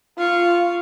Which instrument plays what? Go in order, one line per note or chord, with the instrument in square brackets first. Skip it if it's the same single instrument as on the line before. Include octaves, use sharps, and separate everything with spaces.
[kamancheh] F4 [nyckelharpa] F5 C#6